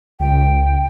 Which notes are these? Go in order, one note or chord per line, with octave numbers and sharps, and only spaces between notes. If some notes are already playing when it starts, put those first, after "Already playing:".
C#2 G5